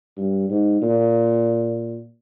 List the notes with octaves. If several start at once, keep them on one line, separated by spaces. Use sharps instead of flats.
G2
G#2
A#2